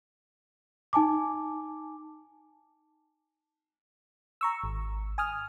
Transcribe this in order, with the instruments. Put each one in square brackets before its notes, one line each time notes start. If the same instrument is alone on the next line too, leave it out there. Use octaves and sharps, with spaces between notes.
[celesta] D#4 G#5 A5 D6
[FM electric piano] A#5 C#6 E6
G#1
G#5 D#6 F6